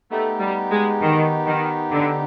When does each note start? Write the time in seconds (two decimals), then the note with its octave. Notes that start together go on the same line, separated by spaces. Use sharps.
0.11 A3 B3 D#4 G4
0.40 G3
0.71 G#3
1.01 D#3
1.46 D#3
1.91 D3